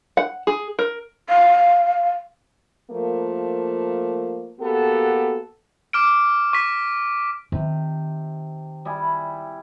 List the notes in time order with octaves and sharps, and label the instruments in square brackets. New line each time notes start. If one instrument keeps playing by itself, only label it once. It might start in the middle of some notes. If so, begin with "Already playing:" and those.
[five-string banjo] F#5
G#4
A#4
[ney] F5
[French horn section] F3 A3 A#3
A#3 B3 F#4 G4 A4
[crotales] D6 F6 D7
C#6 B6
[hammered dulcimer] C3 [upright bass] D#3
[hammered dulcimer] G3 E4 G#4